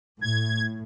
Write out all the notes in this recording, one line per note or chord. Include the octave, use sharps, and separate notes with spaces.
A2 G#6